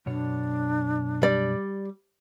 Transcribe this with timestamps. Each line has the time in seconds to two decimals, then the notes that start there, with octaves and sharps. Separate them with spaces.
0.06 F#2 B2 D4 C#5
1.23 G3 D5